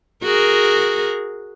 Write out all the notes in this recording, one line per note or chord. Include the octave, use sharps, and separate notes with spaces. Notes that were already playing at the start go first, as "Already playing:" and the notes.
F#4 G#4 A#4